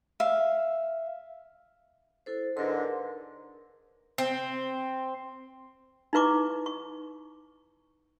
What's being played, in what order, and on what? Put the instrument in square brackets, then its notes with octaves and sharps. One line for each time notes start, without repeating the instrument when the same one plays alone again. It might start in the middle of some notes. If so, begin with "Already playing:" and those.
[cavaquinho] E5 F5
[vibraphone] E4 A4 C5
[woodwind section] G#2 D3 [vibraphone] A#4 B4 C6
[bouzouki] C4
[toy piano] D#4 E4 B4 C#6 D6
C#6